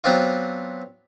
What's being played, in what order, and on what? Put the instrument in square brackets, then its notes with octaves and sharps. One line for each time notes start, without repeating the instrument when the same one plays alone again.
[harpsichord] F#3 B3 C4 D4 F4